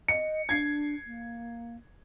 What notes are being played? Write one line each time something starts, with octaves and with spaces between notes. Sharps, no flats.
D#5 C#7
D4 G#6 C7
A#3